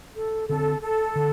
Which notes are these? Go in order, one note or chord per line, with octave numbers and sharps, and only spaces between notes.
A4
D3 C4 A4
A4
D3